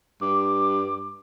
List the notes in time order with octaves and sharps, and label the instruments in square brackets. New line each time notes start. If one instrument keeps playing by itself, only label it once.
[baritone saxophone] G2 [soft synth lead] D6